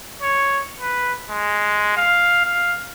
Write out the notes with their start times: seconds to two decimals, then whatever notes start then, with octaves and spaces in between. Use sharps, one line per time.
0.22 C#5
0.80 B4
1.30 G#3
1.97 F5
2.46 F5